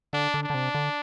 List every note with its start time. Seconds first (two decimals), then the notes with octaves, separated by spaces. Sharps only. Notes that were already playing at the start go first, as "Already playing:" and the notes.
0.13 D3 D4
0.34 D3
0.43 D4
0.50 D3
0.54 C3
0.75 D3